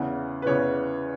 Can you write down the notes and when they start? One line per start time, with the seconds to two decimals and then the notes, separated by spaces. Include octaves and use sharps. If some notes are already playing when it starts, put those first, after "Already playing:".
Already playing: E2 C#3 E3 F#5
0.42 B4
0.46 E2 C#3 E3 C#5